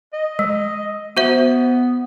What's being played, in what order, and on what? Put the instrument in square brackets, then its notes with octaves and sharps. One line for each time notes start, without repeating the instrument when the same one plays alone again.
[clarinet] D#5
[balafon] G#3
[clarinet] B3 [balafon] F#4 C5 E5